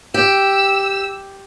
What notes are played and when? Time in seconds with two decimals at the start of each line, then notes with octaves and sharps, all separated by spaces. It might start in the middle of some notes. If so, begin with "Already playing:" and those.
0.14 G4 E6